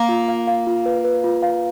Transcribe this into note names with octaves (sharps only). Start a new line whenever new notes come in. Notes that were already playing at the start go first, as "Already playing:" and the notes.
Already playing: A#3
F4
F5
F5
F4
B4
B4
F4
F5